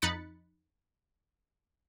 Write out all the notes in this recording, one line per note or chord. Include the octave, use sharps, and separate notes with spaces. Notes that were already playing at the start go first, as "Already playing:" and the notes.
F2 D#4 B5 F#6 A6 C#7